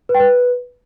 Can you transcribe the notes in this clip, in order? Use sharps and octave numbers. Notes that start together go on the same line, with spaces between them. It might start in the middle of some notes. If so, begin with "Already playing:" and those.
B4
G5
B4